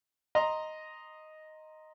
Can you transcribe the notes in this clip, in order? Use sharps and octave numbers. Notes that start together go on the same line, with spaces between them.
D#5 A#5 C6